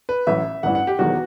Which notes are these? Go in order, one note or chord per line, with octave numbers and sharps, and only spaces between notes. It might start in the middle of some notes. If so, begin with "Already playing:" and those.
B4
A1 A2 F#3 E5
A1 G2 E3 F#5
F#5
G4
E1 E2 D#3 F#3 F#4